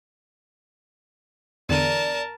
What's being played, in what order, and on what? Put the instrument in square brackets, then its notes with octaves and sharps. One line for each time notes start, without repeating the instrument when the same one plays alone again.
[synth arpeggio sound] E2 D3 D#7 [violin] A#4 A5 [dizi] D5